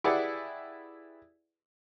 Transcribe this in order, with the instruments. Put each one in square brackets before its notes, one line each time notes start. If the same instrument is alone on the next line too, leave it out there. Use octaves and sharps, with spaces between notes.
[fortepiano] E4 G4 G#4 B4 D5 F#5